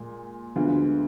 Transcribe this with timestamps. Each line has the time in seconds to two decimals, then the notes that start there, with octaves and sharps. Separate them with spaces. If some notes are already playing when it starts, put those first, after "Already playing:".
Already playing: A#2 G#3
0.56 D2 D3 G#3 B3 F4